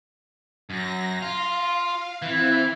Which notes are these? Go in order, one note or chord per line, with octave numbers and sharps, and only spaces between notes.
F#2 A#6
F4 F5
E3 C4 E4